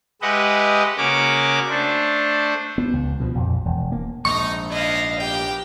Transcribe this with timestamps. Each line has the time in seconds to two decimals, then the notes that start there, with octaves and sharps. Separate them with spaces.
0.22 G#3 G4 B4 D#5 E5 F#5
0.97 C#3 A#3 F#4 C#5 D6
1.70 A3 D4 C5
2.78 B3
2.93 C#2
3.20 B2 D#3 F3
3.35 A#1 F2
3.65 E1
3.92 A#3
4.25 A#1 G#2 D#4 C#6
4.71 C4 D4 E4 D#5 F5
5.20 A#3 B3 G4 G5